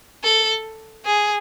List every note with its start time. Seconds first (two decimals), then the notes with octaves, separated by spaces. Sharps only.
0.24 A4
1.05 G#4